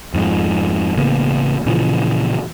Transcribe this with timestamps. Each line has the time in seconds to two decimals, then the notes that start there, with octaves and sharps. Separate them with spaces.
0.14 F2 G#2 F3
0.96 A1 C#3 A#3 B3
1.66 A#2 C#3 E3 F3